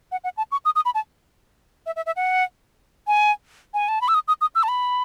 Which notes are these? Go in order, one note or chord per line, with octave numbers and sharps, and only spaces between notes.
F#5
F#5
A5
C#6
D#6
D#6
B5
A5
E5
E5
E5
F#5
G#5
G#5
A5
B5
E6
D#6
D#6
D#6
E6
A5
B5